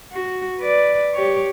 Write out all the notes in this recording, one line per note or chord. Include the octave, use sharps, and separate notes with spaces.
F#4
B4 D5
G4 C#5